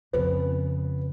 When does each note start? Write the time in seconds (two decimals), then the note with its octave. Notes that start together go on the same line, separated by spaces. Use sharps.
0.13 F2 C#3 B3